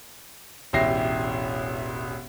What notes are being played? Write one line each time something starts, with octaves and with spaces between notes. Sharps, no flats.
E1 A1 E4 G4 A#6 C7